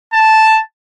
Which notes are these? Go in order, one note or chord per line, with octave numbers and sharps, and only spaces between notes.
A5